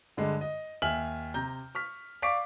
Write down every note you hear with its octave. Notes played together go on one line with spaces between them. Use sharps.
G2 D3 G#3
D#5
D#2 E5 G#5 F6 F#7
C3 A#5 G6
C#6 F6 B6
D5 F5 C#6 D6 B6 D7